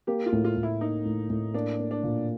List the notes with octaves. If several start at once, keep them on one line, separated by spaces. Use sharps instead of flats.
A#3 G4
F4
A2
F4
A2
E4
A#3 D#4
A2
A2
A#3 D4
A#3
D4
A#2